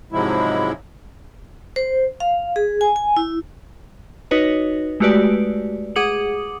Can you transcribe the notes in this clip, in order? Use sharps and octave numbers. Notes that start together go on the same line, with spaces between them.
G#2 C3 F3 F#3 G#3 E4
C5
F5
G#4
G#5
G#5
E4
D#4 F#4 B4 C#5 D#5
G#3 A3 F#4 G4 B4 D5
G#4 F#5 D6 D#6 C#7 F#7